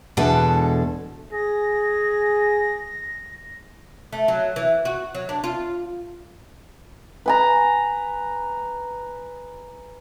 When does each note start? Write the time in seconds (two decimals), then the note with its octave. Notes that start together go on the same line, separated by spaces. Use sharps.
0.17 E2 B2 D3 G#3 A4 F#5
1.33 G#4 A#6
4.13 A3
4.28 F#3
4.56 E3
4.85 F#4
5.15 F#3
5.29 D4
5.44 F4
7.26 B4 G#5 A#5